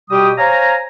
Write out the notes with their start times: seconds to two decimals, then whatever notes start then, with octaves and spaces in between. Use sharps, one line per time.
0.11 B2 G3 G4 G5 D#6
0.38 C5 C#5 F5 G#5 A#5